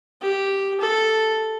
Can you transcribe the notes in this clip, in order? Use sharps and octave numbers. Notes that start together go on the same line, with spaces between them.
G4
A4